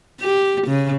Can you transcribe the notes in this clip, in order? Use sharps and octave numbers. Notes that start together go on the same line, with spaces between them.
G4
C#3